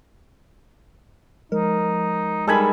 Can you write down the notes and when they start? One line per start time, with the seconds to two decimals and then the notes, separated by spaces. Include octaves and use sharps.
1.52 F3 G#3 D#4 A#4
2.48 G3 G#3 D#4 A4 A#4 G#5 B5